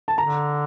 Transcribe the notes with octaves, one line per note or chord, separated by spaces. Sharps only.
A5
D3 A#5